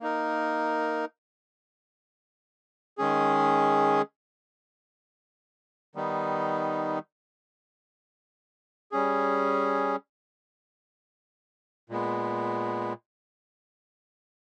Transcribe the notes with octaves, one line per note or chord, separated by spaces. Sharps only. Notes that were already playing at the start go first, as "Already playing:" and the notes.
A#3 D#4 A#4
D#3 G#3 C#4 G#4
D#3 G3 B3 D#4
G3 C#4 G#4
A#2 G#3 B3